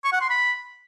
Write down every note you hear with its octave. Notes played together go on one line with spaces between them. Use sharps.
C#6
F#5
C6
B5